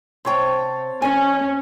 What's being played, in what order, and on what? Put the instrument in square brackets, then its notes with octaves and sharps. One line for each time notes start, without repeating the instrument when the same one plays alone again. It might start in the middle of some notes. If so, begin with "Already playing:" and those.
[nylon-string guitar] C3 G5 [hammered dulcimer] C5 C#5 A5
[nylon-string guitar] F2 G#5 [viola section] C#4